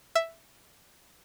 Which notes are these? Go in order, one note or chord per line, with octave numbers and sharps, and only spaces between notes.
E5